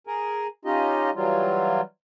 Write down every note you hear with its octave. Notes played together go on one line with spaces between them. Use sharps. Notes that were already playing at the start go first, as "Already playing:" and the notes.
G#4 A#4
C#4 D#4 F4 G4 D#5
E3 F#3 G3 F4